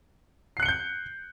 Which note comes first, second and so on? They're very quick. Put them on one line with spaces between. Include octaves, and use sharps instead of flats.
C7 F#6 C#7 G7 G6